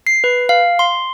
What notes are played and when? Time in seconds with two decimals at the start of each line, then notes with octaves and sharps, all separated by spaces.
0.07 C7
0.24 B4
0.49 F5
0.79 C6